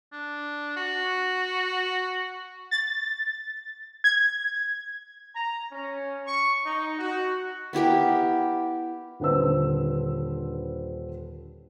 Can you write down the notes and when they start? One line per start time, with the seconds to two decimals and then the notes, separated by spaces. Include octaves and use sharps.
0.12 D4
0.76 F#4
2.71 A6
4.04 G#6
5.35 A#5
5.72 C#4
6.27 C#6
6.66 D#4
6.99 F#4
7.73 B3 E4 G4 A#4
9.20 D#1 D3 B4 C5 E6